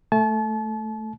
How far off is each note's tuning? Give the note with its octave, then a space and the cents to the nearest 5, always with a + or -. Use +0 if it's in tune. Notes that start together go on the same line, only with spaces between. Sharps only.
A3 +0 A5 -35